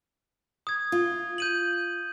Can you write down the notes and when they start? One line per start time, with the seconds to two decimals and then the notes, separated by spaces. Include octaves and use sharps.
0.67 D#6 G#6
0.92 F4
1.38 G6 D#7 F#7